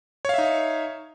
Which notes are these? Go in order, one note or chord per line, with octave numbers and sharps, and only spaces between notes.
D#4 C#5 E5 F5